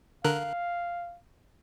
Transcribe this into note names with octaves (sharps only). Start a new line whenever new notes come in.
D3 A#4 F5 F#6